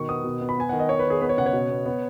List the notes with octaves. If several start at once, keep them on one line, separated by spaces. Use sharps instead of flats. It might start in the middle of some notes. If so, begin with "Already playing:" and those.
Already playing: B2 D#3 C#6
B3 D#6
B2
B3
B5
B3 G#5
D#3 F#5
D#5
B3 C#5
B4
D#3 G#4
B3 B4
C#5
C#3 F#5
C#5
B2
B3
B3